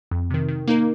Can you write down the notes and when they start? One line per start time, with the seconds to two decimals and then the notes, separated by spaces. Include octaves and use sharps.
0.11 F2
0.30 C3 D#3
0.48 D#3
0.68 A#3 D#4 A#4